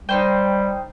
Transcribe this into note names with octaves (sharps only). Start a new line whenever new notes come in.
G3 D#4 C5 G5